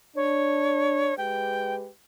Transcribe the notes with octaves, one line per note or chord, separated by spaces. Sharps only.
D4 C#5
G#3 G4 B4 G5